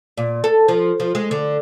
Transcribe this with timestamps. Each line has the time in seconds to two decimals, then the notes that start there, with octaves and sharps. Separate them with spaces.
0.17 A#2
0.44 A4
0.68 F3
1.00 F3
1.15 G#3
1.31 D3